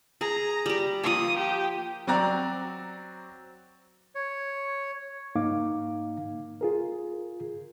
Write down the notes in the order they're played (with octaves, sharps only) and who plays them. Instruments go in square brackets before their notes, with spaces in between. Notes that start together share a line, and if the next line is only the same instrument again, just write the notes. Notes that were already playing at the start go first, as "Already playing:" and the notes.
[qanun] G#4 [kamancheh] A#5
[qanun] G3 G4
[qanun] F3 A#3 [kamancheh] D#6
[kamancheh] G4
[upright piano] F#3 C4 F#4 D5 A#5 F#6
[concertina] C#5
[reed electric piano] G#2 A#3 D#4 F5 D6
F4 G#4 A#4